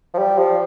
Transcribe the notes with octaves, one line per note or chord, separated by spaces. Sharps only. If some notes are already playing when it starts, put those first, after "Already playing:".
F3
G3
F3